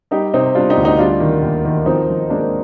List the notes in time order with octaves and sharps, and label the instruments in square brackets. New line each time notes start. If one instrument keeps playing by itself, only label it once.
[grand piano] G3 D#4 G4
C3 C4 D#4
G3 D4 F4
D#4 G4
D2
D#4 G4
G3 D4 F4
D#3
D#2
D#3
F3 C4 D#4
F3
G#3 A#3 D4
C4